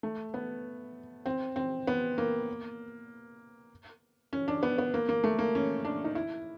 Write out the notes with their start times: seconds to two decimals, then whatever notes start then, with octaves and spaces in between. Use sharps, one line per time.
0.03 A3
0.34 B3
1.26 C4
1.56 C4
1.87 B3
2.18 A#3
4.33 C#4
4.48 D4
4.63 B3
4.78 B3
4.94 A#3
5.09 A#3
5.24 A3
5.39 A#3
5.55 C#4
5.85 D4
6.04 D#4
6.15 E4